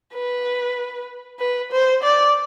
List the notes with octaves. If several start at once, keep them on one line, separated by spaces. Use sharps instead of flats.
B4
B4
C5
D5